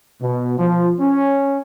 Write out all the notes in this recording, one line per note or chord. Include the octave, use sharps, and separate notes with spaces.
B2
F3
C#4